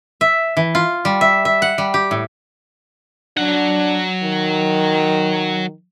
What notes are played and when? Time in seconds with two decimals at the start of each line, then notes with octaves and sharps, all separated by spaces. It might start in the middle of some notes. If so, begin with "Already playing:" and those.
0.21 E5
0.57 E3
0.75 F4
1.05 G3
1.21 E5
1.45 E5
1.62 F#5
1.78 G3
1.94 G4
2.11 A2
3.37 F#3 D4 F#5
4.23 D#3